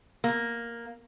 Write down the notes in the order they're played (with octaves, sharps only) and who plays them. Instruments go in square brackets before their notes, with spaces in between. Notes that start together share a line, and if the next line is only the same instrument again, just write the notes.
[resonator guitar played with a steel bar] A#3